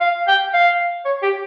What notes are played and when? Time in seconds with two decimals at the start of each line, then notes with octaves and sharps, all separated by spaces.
0.01 F5
0.28 G5
0.53 F5
1.05 C#5
1.23 G4